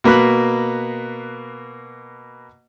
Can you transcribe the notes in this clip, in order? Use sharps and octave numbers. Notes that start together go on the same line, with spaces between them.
B2 A#3 B4 B5 F#6